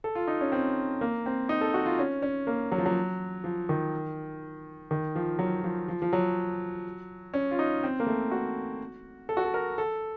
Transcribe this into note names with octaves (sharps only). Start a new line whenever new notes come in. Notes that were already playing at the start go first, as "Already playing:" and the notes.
A4
F4
D#4
C#4
C4
A#3
C4
D#4
A4
F#4
F4
C#4
C#4
A#3
F#3
F3
F#3
F3
D#3
D#3
F3
F#3
F3
F3
F3
F#3
C#4
F4
D#4
C4
A#3
A3
F#4
A4
F#4
A4
A#4
A4